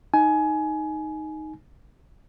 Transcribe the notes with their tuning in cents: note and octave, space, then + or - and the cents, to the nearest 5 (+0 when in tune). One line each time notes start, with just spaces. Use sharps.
D#4 +0 G#5 +20